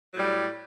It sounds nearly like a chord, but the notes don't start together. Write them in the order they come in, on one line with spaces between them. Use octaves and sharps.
F#3 A2 G3